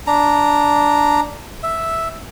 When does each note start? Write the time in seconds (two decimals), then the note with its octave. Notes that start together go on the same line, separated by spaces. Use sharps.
0.07 D4 A#5
1.63 E5